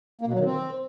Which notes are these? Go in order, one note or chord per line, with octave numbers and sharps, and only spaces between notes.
A#3
B2
F#3
D#3
C4